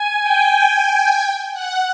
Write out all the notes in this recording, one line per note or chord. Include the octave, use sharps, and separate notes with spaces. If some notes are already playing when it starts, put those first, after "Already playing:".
Already playing: G#5
G5
G#5
G#5
G5
F#5